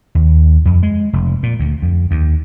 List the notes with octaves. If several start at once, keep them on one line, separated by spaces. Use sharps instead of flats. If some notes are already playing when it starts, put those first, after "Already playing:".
D#2
F2
G#3
F1
A#2
D2
F2
D#2